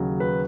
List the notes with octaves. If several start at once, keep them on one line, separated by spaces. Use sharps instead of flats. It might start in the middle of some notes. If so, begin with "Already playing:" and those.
Already playing: D#2 C#3 F#3
B4